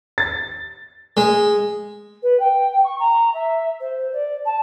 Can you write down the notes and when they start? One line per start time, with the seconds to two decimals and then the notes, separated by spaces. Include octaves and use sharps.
0.18 A6
1.17 G#3
2.22 B4
2.39 G5
2.84 C#6
2.99 A#5
3.33 E5
3.80 C5
4.12 D5
4.45 A5